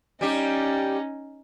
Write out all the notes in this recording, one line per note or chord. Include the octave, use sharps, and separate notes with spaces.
G3 C#4 D#4 G4